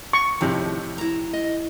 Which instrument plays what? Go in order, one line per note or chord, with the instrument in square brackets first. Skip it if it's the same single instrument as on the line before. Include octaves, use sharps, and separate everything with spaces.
[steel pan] C#6
[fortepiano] F2 A2 C3 [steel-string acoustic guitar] D#3 F3
[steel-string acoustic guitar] E4 A#5
D#5